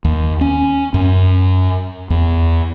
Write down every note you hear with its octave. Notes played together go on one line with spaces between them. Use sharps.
D#2
C#4
F#2
E2